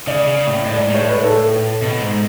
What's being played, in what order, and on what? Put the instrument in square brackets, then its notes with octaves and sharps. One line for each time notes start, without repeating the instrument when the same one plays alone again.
[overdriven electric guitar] C#3 [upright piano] D5
[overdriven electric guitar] C#3
A2
[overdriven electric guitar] A2 [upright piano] D5
[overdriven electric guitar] G#2
[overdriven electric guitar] A2 [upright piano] C#5
[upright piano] B4
A4
[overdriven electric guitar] B2
G#2